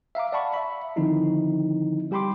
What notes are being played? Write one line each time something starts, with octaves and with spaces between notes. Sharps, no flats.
E5 F5 A#5 D6
D5 F5 F#5 A5 B5 C#6
E5 B5
D3 D#3 F3 C4 D#4 E4
G3 G4 G5 B5 C6 D6